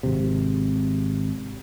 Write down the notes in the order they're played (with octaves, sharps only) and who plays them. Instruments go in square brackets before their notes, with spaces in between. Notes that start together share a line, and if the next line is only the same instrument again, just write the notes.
[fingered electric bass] G#1 C3